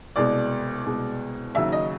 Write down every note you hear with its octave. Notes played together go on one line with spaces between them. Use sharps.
C2 B2 G#3 D5
C2 B2 G#3
D#2 C#3 F#3 E5
D#5